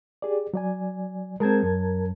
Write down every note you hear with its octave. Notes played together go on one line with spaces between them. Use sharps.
G4 G#4 D5
F#3 D5 G#5
G#3 C4 A#4 A5 G#6
F#2